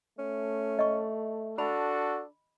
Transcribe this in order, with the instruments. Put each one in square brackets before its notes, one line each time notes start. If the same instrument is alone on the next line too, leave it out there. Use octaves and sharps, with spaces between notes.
[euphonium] A3 [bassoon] C#4
[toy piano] D#5 C#6
[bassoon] D4 [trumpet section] F#4 A4 [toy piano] B5